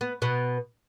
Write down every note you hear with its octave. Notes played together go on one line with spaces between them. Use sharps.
B3
B2 B3